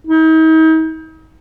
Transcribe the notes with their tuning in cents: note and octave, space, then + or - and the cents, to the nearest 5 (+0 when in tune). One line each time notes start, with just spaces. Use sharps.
D#4 +40